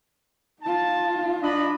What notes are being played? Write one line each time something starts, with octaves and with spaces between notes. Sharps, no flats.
D#4 F4 A5
F#3 D4 D#5 B5